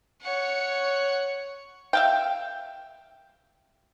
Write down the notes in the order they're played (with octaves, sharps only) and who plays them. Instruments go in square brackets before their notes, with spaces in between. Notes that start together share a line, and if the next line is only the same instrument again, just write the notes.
[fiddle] C#5 F#5
[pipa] E5 F5 G5